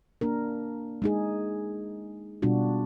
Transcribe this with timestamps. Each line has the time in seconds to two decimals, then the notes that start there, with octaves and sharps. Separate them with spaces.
0.21 A#3 D4 A#4
1.02 G#3 D#4 G#4
2.42 B2 G3 D4 F4 F#4